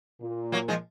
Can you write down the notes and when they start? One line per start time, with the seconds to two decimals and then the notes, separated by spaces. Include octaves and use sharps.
0.21 A#2
0.52 F#3 A#3
0.68 F3 G#3